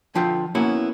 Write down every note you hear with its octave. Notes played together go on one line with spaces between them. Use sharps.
D3 F3 F4 B4 G5
A#3 B3 C#4 E4 F#4